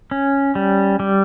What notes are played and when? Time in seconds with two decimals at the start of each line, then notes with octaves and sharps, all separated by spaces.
0.11 C#4
0.55 G3
1.00 G3